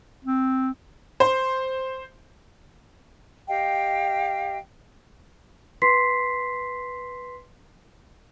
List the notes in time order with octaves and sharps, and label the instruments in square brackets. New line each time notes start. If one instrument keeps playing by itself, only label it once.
[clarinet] C4
[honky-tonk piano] C5
[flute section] G4 D#5 F5 G5
[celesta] B4 C6 B6 C7